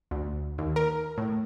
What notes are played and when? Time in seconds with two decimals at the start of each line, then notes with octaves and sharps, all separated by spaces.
0.11 D2
0.58 D#2
0.76 A#4
1.18 A2